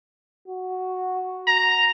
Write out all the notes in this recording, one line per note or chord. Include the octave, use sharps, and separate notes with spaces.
F#4
A#5